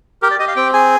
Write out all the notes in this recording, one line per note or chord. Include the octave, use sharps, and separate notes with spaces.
G4 A#4
D5
G4 D#5
F5
C4 G5
G#4 G#5